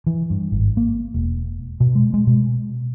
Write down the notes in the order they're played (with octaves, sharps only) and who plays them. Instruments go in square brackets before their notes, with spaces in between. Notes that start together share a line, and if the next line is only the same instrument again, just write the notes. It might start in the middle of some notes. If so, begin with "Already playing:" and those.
[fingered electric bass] E3
G2
G#1
A#3
E1
B2
G#3
G#3
B2